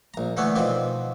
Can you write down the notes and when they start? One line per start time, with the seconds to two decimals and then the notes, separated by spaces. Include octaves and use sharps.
0.14 A#1 A#5
0.37 D3 E3 A3 B3 C#5
0.56 B2 D#3 F3 C4 D4